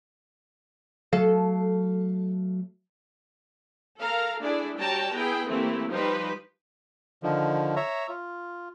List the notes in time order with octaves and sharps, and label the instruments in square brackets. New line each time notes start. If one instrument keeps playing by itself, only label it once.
[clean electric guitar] F#3 A3 F5 [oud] A4
[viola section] A4 A#4 F5 A#5
A3 D4 E4 G#4 D5
G3 F#4 C#5 G5 A5 A#5
B3 E4 G#4 B4 G5
E3 A3 A#3 C4 E4 G4
F3 G3 D#4 G4 B4 C5
[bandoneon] D3 D#3 F3
C#5 E5 A#5
F4